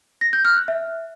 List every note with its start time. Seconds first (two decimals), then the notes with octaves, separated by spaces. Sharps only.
0.21 A#6
0.33 G6
0.45 F6
0.56 F#6
0.68 E5